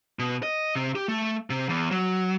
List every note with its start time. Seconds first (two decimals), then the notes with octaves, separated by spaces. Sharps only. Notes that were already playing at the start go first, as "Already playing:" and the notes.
0.19 B2
0.43 D#5
0.75 C3
0.95 G4
1.08 A3
1.50 C3
1.69 E2
1.91 F#3